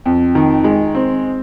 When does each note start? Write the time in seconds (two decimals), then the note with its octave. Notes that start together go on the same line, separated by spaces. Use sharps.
0.06 F2
0.35 D#3
0.64 G#3
0.95 C4